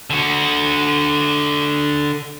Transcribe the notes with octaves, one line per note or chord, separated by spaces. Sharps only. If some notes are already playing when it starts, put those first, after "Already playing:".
D3 F#4